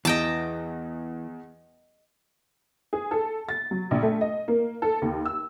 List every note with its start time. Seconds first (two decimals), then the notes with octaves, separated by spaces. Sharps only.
0.05 E2 E3 D#5 G5 A5
2.93 G#4
3.11 A4
3.49 A6
3.71 F#3
3.91 A#1
4.03 A3
4.21 D#5
4.48 A#3
4.82 A4
5.02 D#2
5.25 E6